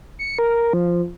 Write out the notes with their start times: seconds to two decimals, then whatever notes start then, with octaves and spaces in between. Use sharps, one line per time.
0.19 C#7
0.39 A#4
0.73 F3